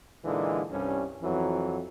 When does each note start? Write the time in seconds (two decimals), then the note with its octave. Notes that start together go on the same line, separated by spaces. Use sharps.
0.25 A#2 D3 E3 G#3 A#3 D#4
0.71 C2 G2 C#4
1.22 F2 E3 F#3